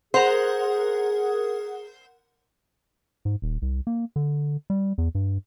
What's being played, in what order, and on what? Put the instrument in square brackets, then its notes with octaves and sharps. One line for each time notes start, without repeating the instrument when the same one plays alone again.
[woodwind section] G#4 [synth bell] A#4 F#5 [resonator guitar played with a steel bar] C5
[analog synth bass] G#2
D#1
C2
A#3
D3
G3
E2
G2